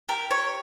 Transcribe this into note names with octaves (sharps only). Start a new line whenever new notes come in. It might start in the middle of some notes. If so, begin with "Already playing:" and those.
G4 A#4
C#5